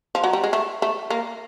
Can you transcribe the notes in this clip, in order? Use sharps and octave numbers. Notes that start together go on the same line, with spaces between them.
F3
F#3
G3
G#3
A3
A3
A#3